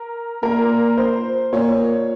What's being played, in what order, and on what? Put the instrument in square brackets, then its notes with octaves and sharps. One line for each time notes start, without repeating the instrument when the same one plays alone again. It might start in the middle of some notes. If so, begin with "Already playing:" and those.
Already playing: [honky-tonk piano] A#4
[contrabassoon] A#2 [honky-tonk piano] A#4
[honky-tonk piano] C5
[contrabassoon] A#2 [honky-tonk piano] C#5